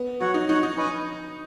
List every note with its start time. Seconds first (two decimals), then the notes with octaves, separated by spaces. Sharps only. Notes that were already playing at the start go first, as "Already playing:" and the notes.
Already playing: B3
0.20 F#3 F#4 C#5 F#5
0.34 D#4
0.49 D#4 F#4 C#5 F#5
0.63 D#4
0.77 C#4 B4 D#5 G#5